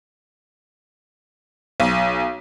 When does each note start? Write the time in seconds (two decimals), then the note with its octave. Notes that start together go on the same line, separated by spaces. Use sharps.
1.80 B1